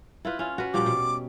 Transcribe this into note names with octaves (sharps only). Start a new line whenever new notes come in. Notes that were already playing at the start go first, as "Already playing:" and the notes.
E4 F4 B4
C#4 F4
F#4 B4
A#2 F3 G3 D6
B2